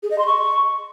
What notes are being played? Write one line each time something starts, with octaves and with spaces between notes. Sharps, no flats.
G#4
D#5
C6
C#6